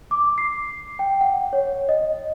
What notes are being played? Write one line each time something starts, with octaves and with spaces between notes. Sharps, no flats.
D6
C7
G5
F#5
C#5
D#5